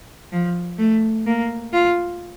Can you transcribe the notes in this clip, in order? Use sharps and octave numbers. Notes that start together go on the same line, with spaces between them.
F3
A3
A#3
F4